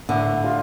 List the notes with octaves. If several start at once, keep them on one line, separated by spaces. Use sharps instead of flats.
A2 D3
F4